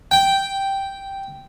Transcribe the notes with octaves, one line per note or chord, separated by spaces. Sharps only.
G5